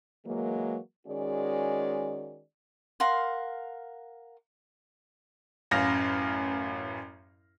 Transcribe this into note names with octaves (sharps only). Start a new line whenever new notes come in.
E3 F#3 G#3 A#3
D#3 G#3 C#4 F#4 G#4 D5
A#4 F5 F#5 C6
A1 F#2 F5 F6 A#6